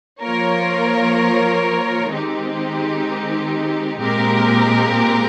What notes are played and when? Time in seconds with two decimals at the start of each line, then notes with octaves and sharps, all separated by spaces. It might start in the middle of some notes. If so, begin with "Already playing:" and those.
0.21 F3 A#3 F4 A#4 C#5
2.11 D#3 G#3 C4 D#4 G4
4.00 A#2 G#3 C4 G4 A#4